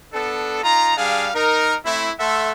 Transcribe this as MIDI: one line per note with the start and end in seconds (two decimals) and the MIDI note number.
0.13 0.61 59
0.13 0.61 62
0.13 0.61 69
0.64 0.95 63
0.64 0.95 65
0.64 0.95 82
0.97 1.29 55
0.97 1.29 62
0.97 1.29 68
0.97 1.29 77
1.34 1.76 63
1.34 1.76 70
1.85 2.12 57
1.85 2.12 60
1.85 2.12 64
2.19 2.52 57
2.19 2.52 69
2.19 2.52 76
2.19 2.52 78
2.19 2.52 84